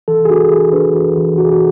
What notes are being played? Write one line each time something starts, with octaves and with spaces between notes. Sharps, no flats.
E3 A4
G#4
D4 F#4
E3 G#4
D4 B4
E3 F#4
E3
E3 F#4
G#4
F#4